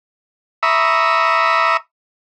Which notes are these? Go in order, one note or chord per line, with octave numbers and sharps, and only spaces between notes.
E5 A#5 B5 C#6 D#6 E6